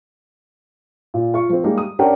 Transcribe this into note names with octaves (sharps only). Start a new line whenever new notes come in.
A#2
F4 C#6
F3 C4
G3 G#3 A#3 D#4 G4
D#6
C#4 D4 G4 A#4 F#5 G5